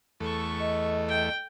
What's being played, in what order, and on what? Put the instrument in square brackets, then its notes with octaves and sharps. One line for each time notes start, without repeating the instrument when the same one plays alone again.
[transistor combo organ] E2 A3 [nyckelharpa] A4 C#6
[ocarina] D#5
[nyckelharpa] G5